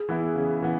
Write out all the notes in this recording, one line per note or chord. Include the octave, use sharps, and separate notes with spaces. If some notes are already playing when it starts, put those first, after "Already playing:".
Already playing: G#4
E3 B3 E4
C#3
E3 B3